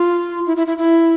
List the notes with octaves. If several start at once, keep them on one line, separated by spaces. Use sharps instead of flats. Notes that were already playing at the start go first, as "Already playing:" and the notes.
Already playing: F4
E4
E4
E4
E4